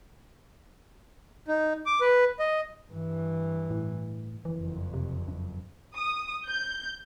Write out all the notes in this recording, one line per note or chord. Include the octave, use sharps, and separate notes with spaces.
D#4
D6
B4
D#5
G2 E3
A2
F#1 F2 E3
C3
F#2
D#6
G6